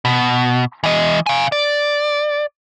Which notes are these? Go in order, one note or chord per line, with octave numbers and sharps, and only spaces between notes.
B2
E3 D#5
F5 G#5
D5